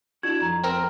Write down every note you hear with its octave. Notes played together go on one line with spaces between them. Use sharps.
D4 E4 F#4 G#6
F2 A#5
C4 A#4